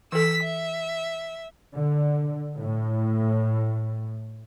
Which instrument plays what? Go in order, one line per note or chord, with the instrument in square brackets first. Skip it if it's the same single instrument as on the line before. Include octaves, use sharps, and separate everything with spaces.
[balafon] E3 A4 [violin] E6 B6
[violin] E5
[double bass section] D3
A2